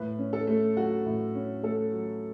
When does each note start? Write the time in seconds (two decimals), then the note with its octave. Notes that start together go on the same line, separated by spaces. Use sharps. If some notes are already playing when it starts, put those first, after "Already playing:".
Already playing: A2 B4
0.19 C#4
0.33 A4
0.47 A3
0.77 F#3 F#4
1.06 A2
1.35 C#4
1.63 A3 A4
1.93 F#3